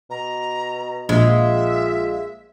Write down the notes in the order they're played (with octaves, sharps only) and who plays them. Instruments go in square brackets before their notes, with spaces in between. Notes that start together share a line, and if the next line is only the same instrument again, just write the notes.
[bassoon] B2 [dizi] A#5
[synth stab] A#1 [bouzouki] G#3 [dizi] E5
[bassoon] F4